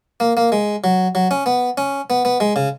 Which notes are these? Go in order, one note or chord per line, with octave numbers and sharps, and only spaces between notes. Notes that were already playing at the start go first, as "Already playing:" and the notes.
A#3
A#3
G#3
F#3
F#3
C#4
B3
C#4
B3
B3
G#3
C#3